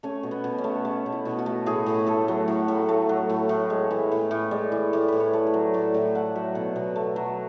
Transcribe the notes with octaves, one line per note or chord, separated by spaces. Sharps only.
A3 C#4
B2
B3
B2
C#4
A3
A3
B2
E4
B2
F#4
A3
A2 G#4
A2
A3 A4
F#3
A2
A2
A3
F#3
A2
A2
G#3
E3
A2
A2
G#3 D5
E3
A2 D5
A2 B4
C#5
A3
C#5
F#3
A2 D5
A2 E5
A3 F#5
F#3 E5
B2 F#5
B2
A3
F#3